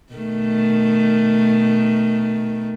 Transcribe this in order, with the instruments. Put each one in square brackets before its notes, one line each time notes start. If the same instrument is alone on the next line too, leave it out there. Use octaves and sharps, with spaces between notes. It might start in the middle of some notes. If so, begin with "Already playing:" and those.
[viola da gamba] B2 D#3 A3